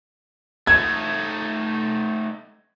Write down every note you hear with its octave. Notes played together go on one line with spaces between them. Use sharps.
A3 D#4 G#6